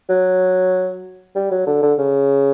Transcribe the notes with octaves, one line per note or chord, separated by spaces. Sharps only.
F#3
G3
F#3
D3
D3
C#3